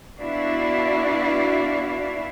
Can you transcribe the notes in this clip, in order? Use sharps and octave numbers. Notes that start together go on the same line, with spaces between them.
B3 D4 E4 F#4 D5 F5